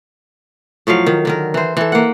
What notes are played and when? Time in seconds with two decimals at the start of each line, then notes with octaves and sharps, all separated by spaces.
0.87 A2 F3 F#3 F5
1.07 D#3
1.25 D3 D#3 A#4
1.54 E3 C5
1.77 E3 A4
1.92 A#3 F#5